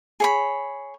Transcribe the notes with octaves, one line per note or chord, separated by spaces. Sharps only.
G#4 C#5 B5